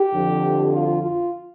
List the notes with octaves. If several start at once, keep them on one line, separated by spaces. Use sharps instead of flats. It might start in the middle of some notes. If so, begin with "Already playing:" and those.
Already playing: G4
F2 D3 F3
F4
F4